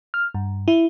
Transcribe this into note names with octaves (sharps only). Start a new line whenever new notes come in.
F6
G2
E4